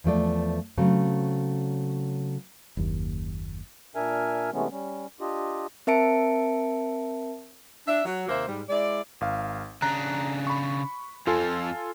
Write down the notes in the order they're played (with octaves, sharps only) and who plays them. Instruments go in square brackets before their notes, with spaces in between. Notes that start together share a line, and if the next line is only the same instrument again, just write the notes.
[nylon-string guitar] E2 F3 A3 D5
C#3 F#3 A3 C4
[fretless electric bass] F#1 D#2
[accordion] A#2 D4 A#4 E5 G#5 F6
C3 E3 G#3 A3 B3 C#4
G3 C#4
D4 F4 G4 D#5
[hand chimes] C4 A#4 E5 A5 C#7 D7
[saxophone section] D4 E5
F#3
D#2 C3 A#3 C5 E5
G#2 G3
G#3 E4 D5
[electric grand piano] G#1 F5
[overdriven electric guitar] C#3 D4 [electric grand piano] A#5 F#6
[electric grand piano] B5 C#6
[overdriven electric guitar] F2 F3 [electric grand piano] F4 A4 G#5